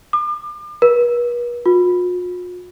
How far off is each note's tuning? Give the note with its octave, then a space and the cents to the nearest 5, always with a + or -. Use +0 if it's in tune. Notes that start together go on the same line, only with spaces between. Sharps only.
D6 +40
B4 -45
F4 +45